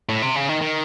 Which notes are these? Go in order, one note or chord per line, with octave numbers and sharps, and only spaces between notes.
A2
C3
C#3
D#3
D#3